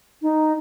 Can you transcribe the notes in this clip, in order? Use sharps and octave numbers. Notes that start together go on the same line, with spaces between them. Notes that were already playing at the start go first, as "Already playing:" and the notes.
D#4